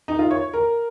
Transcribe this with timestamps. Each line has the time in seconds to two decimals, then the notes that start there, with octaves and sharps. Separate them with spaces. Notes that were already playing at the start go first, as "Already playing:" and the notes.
0.08 D#4
0.19 F4
0.31 C#5
0.53 A#4